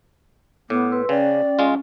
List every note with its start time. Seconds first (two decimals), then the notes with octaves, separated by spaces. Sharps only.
0.70 A2 B3 D6
0.91 B4 C6 E6
1.09 C#3 C#4 D5 G5
1.59 G#3 C#4 F4